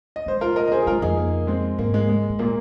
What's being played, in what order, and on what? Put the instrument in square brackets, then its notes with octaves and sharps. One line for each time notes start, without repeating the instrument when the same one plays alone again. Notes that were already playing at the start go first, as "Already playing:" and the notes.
[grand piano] D#5
[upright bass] G#3 [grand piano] C5
[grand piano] F4 A#4
A#4 D#5
D#5
G#4 C5
G#4
[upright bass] G#3 [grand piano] F4 A#4
[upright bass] F2 [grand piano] D#4 G#4
[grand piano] A#3
G#3 C4
[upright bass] G#2 [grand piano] A#3
[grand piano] G#3
G#3
[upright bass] G#2
[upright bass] A#2 [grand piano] A#3